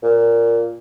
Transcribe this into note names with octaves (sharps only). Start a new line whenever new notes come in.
A#2